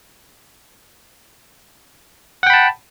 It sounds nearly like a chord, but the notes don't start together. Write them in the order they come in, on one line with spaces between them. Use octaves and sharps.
F#5 G5 B5 A5